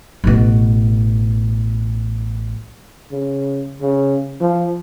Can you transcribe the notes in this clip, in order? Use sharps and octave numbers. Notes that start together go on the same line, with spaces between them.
A1 B2
C#3
C#3
F3